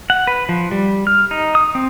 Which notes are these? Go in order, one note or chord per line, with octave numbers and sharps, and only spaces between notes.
F#5
B4
F3
G3
F6
D#4
D#6
C4